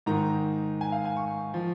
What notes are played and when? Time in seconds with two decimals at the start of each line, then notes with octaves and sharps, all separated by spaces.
0.06 G#2 D#3 A#5
0.81 G#5
0.92 F5
1.05 G#5
1.17 C#6
1.54 F3